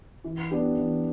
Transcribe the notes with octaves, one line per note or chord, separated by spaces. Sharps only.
E3
B3 D4 G4
E3